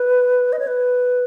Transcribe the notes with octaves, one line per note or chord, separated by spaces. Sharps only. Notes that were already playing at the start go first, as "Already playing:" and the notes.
Already playing: B4
D#5
C#5
B4